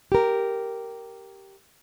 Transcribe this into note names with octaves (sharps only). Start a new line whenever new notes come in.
G4 A#4